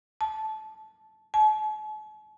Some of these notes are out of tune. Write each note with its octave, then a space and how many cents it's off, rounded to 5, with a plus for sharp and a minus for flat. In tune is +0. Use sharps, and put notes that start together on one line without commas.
A5 -15
A5 -45